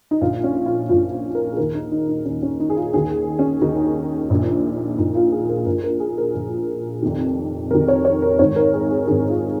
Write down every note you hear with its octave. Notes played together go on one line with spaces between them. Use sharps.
D#4
A#1 A#2 F3 F4
C#4
F4
A#1 A#2 F3 F4
F4
A#4
G#4
D#2 D#3 A#4
D#4
D#4
D#4
D#2 D#3 C#4
C#4
D#4
G#4
F4
D#2 D#3 G#4
C#4
D#2 D#3 D#4
A#1 A#2 F3
A#1 A#2 F3 D#4
F4
G#4
A#4
A#1 A#2 F3 A#4
A#4
G#4
A#4
A#1 A#2 F3
F1 F2 D#3
F1 F2 D#3 A#4
C#5
C#5
A#4
G#1 G#2 D#3 C#5
A#4
G#4
G#4
G#1 G#2 D#3 G#4
D#4
F4